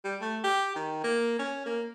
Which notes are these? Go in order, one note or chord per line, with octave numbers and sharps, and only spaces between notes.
G3
A3
G4
D#3
A#3
C#4
A#3